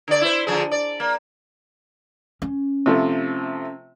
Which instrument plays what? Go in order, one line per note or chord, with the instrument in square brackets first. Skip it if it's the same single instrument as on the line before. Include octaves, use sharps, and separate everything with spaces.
[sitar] D3 D5
E4 C5
D3 F3 G#4
D5
A#3
[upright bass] C#4
[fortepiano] C3 F3 A3